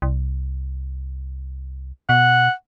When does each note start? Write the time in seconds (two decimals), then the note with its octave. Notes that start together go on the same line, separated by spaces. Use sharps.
0.02 C2
2.09 B2 F#5